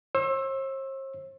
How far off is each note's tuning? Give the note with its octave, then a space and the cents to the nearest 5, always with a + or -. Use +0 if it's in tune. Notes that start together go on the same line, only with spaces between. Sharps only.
C5 +45 E6 +0